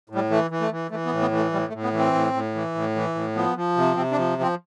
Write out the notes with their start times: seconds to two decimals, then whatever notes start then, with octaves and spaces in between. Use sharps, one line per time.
0.10 A2
0.15 G3
0.30 E3 A3
0.51 E3
0.61 A3
0.71 E3
0.90 E3 A3
1.06 B3
1.12 A2
1.21 B3
1.31 E3
1.36 A3
1.52 A2 G3
1.68 A3
1.73 A2
1.83 B3
1.93 E3
1.99 C4
2.14 A2
2.33 A2
2.55 E3
2.75 A2
2.96 E3
3.15 A2
3.35 F3 B3
3.56 F3
3.76 C3
3.97 C3 C4
4.12 D4
4.17 F3
4.38 F3 C4